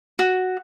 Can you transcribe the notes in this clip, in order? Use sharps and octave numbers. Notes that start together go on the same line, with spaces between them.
F#4